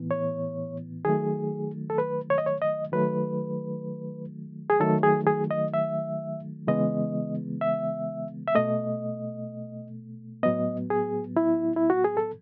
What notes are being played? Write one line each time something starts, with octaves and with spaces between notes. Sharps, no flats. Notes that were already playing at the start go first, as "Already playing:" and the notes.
Already playing: A2 E3 B3
C#5
D#3 F#3 A3 G#4
A4
B4
C#5
D#5
C#5
D#5
D#3 F#3 A3 B4
G#4
D#3 F#3 A3 A4
G#4
G#4
D#5
E5
C#3 E3 G#3 B3 D#5
E5
E5
B2 A3 D#5
A2 F#3 B3 D#5
G#4
E4
E4
F#4
G#4
A4